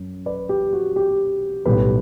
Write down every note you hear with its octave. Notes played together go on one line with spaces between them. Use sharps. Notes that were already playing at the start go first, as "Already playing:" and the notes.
Already playing: F#2
B4 D5
G4
F#4
G4
B1 A2 G3 G4 B4